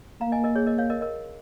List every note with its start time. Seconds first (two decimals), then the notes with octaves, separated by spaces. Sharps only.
0.21 A#3 F5 A#5
0.32 D#5 G#5
0.44 A#4 D#5
0.56 G#4 C#5
0.66 A#4 D#5
0.78 C#5 F5
0.90 A#4 D#5
1.01 A#4 D#5